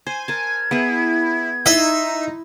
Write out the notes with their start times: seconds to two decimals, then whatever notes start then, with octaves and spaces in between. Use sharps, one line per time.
0.07 C5 G#5
0.28 A#4 A5 G#6
0.71 B3 E4 G#4 B4
1.66 D#4 E4 D#5 E5 C6